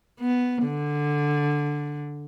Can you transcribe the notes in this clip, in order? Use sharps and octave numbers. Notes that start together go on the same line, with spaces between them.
B3
D3